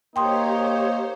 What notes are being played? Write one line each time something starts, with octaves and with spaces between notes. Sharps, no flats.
A#3 D#4 G4 C5 C#5 G5 C6 D#6